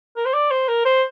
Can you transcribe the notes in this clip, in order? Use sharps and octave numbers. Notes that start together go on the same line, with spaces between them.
A#4
C5
D5
C5
A#4
C5